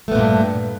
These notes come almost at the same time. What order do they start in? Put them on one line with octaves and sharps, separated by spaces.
A3 B3 A#2 G2